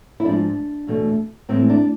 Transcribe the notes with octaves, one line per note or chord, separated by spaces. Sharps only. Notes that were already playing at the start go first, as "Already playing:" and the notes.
E4
G#2 F3 G#3 D4
E2 B2 A3
A2 E3 G#3 C4
D4